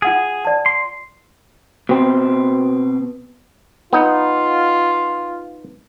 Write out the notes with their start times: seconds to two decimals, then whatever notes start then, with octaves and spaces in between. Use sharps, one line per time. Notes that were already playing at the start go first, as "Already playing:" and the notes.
0.02 F4 G#4 F#5 D#6
0.45 D5 A5
0.66 C6
1.89 B2 C4
3.93 B3 D#4 F4